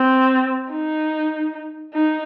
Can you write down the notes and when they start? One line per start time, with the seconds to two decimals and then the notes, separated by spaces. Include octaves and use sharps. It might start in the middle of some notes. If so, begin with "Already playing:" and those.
Already playing: C4
0.72 D#4
1.94 D#4